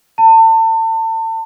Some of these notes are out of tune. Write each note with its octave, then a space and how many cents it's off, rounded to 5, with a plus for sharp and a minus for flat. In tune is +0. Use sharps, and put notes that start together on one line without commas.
A5 +35